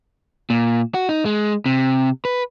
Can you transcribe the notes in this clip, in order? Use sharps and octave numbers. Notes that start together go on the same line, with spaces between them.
A#2
F#4
D#4
G#3
C3
B4